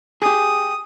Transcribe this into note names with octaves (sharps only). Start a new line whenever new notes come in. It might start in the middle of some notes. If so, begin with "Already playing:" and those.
G4 G#4 D#6